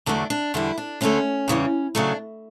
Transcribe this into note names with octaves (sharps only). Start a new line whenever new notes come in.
E2 D3 F#3 A3 D4
D4
E2 D3 G3 E4
D4
D2 D3 A3 C#4
E2 C#3 E3 G3
C#3 F#3 A3 D4